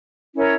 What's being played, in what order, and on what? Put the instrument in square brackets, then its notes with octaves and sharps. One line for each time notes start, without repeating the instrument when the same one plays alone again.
[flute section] C#4 E4 A#4 C#5